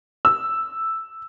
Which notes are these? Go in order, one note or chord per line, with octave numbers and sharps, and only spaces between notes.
E6